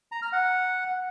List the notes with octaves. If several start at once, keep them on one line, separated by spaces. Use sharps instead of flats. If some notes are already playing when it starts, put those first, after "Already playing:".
A#5
F6
F#5